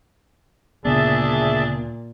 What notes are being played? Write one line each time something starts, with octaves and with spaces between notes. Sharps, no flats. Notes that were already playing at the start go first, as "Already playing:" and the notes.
D2 A#2 C#3 B3 D4 G#4 E5 A5